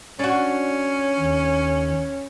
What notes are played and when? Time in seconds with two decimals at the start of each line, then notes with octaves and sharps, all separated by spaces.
0.19 C#4 D4 F#4
1.20 D#2